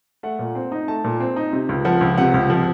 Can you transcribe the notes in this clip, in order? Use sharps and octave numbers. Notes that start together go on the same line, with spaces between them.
A3 F#5
A#2
C4
D#4
A3 A5
A#2
C4
D#4
C3
C#2
F3 F#5
C#2
C3 F#5
C#2
F3